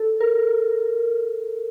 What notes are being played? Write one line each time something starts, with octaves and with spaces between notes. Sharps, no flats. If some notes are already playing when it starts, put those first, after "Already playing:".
Already playing: A4
A#4